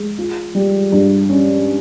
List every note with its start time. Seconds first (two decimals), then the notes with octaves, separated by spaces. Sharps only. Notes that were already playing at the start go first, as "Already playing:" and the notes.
Already playing: G#3
0.18 F4
0.55 G3
0.92 G2
1.29 C#4